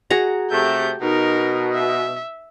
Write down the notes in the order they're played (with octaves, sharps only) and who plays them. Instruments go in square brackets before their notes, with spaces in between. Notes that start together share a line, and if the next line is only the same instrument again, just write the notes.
[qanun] F#4 G#4 A#5
[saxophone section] C3 A3 [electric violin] G4 G6
[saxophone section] B2 [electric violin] D#4 A#4
[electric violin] E5